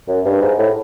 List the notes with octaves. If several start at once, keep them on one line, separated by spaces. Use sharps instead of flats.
F#2
G2
G#2
A2